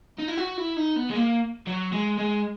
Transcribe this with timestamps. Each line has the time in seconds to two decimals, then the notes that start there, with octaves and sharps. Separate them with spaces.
0.18 D#4
0.28 E4
0.37 F#4
0.57 E4
0.77 D#4
0.96 B3
1.10 G#3
1.16 A#3
1.67 F#3
1.92 G#3
2.18 G#3